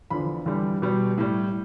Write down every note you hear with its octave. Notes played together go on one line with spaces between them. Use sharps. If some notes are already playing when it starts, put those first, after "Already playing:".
E2 D3 F3 B5
E2 D3 G3
B2 G3
A2 G3